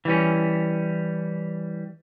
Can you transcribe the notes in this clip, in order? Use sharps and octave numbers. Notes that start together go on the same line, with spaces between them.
E3 G3 C#4